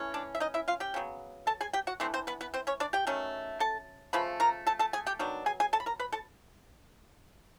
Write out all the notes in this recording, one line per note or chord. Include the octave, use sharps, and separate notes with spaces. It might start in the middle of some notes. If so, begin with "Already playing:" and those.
Already playing: E3 A3 C#4
D4 D5
E5
D#4 D#5
E4 E5
F4 F5
G4 G5
C#3 F#3 B3
A4 A5
G#4 G#5
G4 G5
F#4 F#5
E3 A3 C4 D4 C5
C4 C5
B3 B4
B3 B4
C4 C5
C#4 C#5
D4 D5
G4 G5
D#3 F#3 A3 C#4
A4 A5
C#3 F3 A3 B4 B5
A#4 A#5
A4 A5
A4 A5
G#4 G#5
G4 G5
D#3 F#3 B3 D4
G#4 G#5
G#4 G#5
A4 A5
B5
A#4 A#5
B4 B5
A4 A5